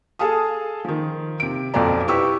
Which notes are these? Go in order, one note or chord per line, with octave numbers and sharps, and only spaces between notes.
G#4 A4 F5 A5 D#6
D#3 F3
C3 D7
B1 F2 F4 A4 D5 A#5
E4 G4 B4 C#6 D6 E6